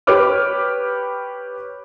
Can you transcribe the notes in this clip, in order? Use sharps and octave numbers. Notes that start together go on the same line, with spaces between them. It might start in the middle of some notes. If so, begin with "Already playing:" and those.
G4 B4 C#5 D6 F6